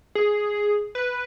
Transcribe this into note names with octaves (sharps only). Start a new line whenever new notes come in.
G#4
B4